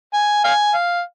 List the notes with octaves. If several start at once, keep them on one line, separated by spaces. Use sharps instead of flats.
G#5
F5 G#5
F5